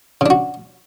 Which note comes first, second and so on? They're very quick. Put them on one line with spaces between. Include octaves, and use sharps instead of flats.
C#3 D4 F#4